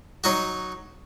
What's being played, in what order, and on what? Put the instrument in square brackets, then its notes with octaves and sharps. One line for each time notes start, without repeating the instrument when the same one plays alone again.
[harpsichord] F#3 D#4 F#4